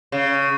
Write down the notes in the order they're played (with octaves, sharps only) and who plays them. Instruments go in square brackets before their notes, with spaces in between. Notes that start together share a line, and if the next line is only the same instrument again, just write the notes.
[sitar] C#3